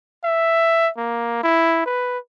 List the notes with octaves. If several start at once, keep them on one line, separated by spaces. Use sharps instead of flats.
E5
A#3
E4
B4